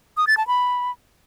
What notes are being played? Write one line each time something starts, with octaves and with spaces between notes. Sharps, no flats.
D#6
A6
A5
B5